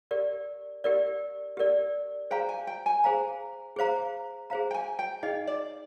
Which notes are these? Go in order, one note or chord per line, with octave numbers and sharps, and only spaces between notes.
G4 A#4 D5
G4 A#4 D5
G4 A#4 D5
G#4 C5 F5 G5 A#5
G#5
G5
G#5
G#4 C5 F5 A#5
G#4 C5 F5 A#5
G#4 C5 F5 A#5
G5
G#5
G5
D#4 G#4 D#5 F5
D5